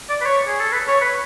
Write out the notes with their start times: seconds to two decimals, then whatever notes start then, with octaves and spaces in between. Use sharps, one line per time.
0.09 D5
0.21 B4
0.25 C#5
0.47 G#4
0.60 A4
0.72 B4
0.88 C#5
1.01 B4